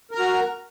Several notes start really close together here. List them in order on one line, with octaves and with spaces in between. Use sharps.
A#4 A#5 F#4